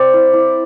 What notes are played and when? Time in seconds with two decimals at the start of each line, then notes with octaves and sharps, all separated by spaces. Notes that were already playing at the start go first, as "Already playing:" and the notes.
Already playing: C4 C5 D5
0.13 E4
0.33 E4